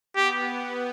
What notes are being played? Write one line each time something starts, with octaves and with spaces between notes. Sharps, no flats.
B3 G4